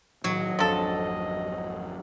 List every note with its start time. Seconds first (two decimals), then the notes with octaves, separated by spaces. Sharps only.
0.24 A2 D#3 F#3 D#5
0.59 G#1 F2 F3 D4 A4